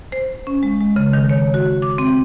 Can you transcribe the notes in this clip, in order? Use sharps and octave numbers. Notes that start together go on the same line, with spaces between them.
C5
C#4
G#3
G#3
C#3
D#3
C#5
F#4
D6
C4